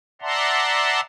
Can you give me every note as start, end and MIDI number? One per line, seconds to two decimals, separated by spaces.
0.22 1.01 74
0.22 1.01 76
0.22 1.01 78
0.22 1.01 81
0.22 1.01 82
0.22 1.01 84